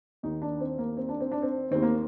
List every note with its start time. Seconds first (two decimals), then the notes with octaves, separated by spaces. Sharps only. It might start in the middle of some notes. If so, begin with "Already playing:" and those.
0.23 D#2 D#3 D#4
0.42 D4
0.60 C4
0.78 A#3
0.97 C4
1.09 D4
1.21 C4
1.32 D4
1.42 C4
1.71 D#2 D#3 C4
1.83 A#3